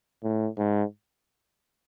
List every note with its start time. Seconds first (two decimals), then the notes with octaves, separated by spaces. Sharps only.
0.24 A2
0.58 G#2